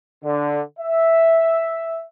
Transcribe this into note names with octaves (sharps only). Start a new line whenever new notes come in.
D3
E5